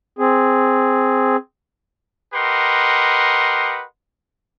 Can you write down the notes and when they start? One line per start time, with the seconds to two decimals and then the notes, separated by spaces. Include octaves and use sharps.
0.19 C4 G#4
2.33 G4 A#4 B4 D#5 F#5 C6